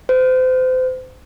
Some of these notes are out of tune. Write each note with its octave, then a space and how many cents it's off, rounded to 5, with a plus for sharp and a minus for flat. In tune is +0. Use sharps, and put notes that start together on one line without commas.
C5 -35